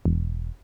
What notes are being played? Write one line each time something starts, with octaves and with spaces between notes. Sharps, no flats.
E1